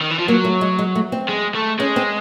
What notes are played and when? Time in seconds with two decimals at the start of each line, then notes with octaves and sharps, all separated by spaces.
0.01 D#3
0.11 E3
0.19 F3
0.28 F#3 A#3
0.45 A3
0.61 G#3
0.79 G#3
0.95 A3
1.12 C4
1.29 G#3
1.55 A3
1.79 G#3 C#4
1.96 C4